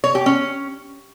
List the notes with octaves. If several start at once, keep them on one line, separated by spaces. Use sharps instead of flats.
C#5
G4
C#4